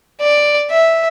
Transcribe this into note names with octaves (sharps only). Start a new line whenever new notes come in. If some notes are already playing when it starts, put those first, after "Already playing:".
D5
E5